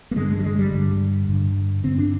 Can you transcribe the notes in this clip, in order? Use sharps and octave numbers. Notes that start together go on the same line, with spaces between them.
A#3
G2 D3 G#3
G#3
G3
G#3
G3
G2 D3
G2 D3
G2 D3 C4
D4